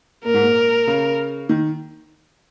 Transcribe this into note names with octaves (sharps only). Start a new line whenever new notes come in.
A#2 A#4
G#2
A#2
C#3
D#3